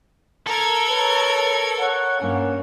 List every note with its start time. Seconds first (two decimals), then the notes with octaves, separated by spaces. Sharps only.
0.47 A4 A#4 G#6
0.90 B4 C#5
1.80 C#5 F#5
2.21 G2 A#3 C#4